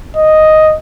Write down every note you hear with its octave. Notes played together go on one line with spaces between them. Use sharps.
D#5